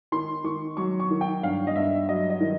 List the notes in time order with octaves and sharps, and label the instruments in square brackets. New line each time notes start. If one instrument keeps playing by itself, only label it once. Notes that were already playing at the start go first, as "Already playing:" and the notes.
[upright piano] D#3 C6
D#3 C#6
F#3 C#6
C#6
D#3
G5
G2 F5
D#5
G2 E5
F#3 D#5
D#5
D#3